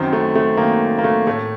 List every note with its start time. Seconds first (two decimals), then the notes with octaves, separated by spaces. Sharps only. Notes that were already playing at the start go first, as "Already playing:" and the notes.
Already playing: F#2 D#3 C4
0.13 A3
0.35 A3
0.57 F#2 D#3 A#3
0.98 A#3
1.04 A3
1.27 A2 A3